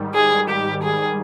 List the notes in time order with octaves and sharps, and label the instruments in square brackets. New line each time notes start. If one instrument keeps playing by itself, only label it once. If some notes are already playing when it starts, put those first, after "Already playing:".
Already playing: [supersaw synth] G#2 D#3 G3
[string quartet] G#4
G4
G#4